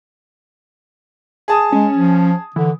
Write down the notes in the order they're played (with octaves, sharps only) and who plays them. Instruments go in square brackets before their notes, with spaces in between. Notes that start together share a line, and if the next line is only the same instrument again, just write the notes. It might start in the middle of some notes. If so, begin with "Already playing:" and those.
[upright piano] G#4 A5 D#6
[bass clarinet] G#3 [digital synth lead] C#4
[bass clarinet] F3
[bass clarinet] D3 [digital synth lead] E3